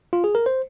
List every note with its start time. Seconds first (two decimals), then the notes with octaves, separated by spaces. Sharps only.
0.13 F4
0.24 G#4
0.35 A#4
0.46 C5